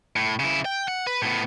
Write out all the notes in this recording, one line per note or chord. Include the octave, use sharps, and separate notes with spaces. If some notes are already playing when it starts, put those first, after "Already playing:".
A2
C#3 E4
G5
F#5
B4
A2 B3